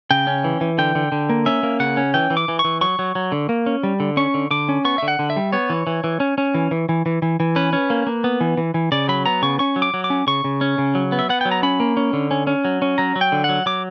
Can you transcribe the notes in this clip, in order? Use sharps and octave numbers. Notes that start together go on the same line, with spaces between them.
C#3 G5
C#4
E3
E3
D3 G5
D3
D3
A#3
C#4 E5
A#3
C#3 F#5
C#4
E3 G5
E3
D6
E3
C#6
E3
F#3 C#6
F#3
F#3
D3
A#3
C#4
G3
D3
C#4 C#6
D3
D3 D6
C#4
B3 C#6
E5
D3
F#5
D3
E5
G3
B3 C#5
E3
E3
E3
C#4
C#4
E3
E3
E3
E3
E3
E3
C#4 B4
C#4
A#3
A#3
B3
E3
E3
E3
C#3 D5
F#3 B5
B3 A#5
C#3 C#6
C#4 C#6
F#3
D6
F#3
D6
C#4
C#3 C#6
C#3
C#4
C#3
F#3
B3
E5
B3 F#5
F#3 G5
A#5
C#4 B5
A#3
C#4
D3
C#4
C#4
F#3
C#4
F#3 A#5
F#3
G5
D3
F#5
F#3
F#3 D6